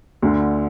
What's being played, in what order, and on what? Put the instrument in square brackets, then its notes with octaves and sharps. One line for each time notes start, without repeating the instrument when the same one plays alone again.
[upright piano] D2 D3